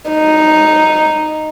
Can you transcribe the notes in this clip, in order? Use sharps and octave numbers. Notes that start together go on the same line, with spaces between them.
D#4